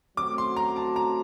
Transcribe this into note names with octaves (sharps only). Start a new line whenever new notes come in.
F#3 A3 C4 F#4 D6
C6
A#5
A5
A#5